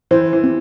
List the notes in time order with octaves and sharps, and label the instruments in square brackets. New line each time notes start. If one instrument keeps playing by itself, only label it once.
[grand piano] E3 [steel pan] C5
[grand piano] E3
[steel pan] C4